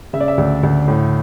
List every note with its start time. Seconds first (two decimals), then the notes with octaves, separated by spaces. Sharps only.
0.13 C#3 E5
0.20 D5
0.28 E5
0.38 D2
0.63 D2
0.88 A2